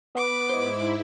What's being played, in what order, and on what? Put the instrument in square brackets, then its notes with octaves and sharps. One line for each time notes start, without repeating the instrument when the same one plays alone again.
[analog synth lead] B3 [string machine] B4 [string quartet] D6
[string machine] G#2 E4 [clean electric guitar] C5 D#5